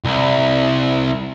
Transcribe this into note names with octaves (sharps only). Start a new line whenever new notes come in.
C2